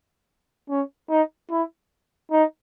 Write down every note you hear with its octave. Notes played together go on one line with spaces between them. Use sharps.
C#4
D#4
E4
D#4